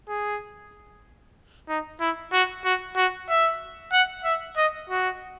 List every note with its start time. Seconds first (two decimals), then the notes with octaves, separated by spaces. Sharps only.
0.08 G#4
1.69 D#4
2.00 E4
2.33 F#4
2.64 F#4
2.96 F#4
3.29 E5
3.92 F#5
4.24 E5
4.57 D#5
4.90 F#4